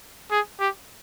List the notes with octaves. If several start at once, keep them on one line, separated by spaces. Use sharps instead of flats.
G#4
G4